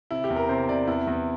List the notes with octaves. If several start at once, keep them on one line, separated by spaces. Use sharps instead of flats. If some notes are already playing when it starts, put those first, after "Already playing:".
C3 E4
G4
E2
A#4
C3 C5
C3 D5
E2 E4
E2